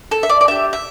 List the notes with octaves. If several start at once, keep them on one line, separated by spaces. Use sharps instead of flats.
A4
E5
D5
D5
D4 G4 E5
E5